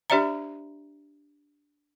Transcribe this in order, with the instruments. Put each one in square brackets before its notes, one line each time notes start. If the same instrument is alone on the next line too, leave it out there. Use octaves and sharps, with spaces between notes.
[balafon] D4 G4 C5 D5 E5 A#5